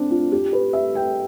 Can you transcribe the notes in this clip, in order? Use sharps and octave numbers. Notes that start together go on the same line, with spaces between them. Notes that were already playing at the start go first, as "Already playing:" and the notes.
Already playing: C4 D4
F4
G4
B4
E5
G5